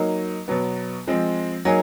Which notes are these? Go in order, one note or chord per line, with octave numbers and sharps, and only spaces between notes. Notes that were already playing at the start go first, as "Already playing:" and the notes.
Already playing: F#3 A#3 D#4
B2 F#3 B3
F3 G#3 C4
F#3 A#3 D#4 G#4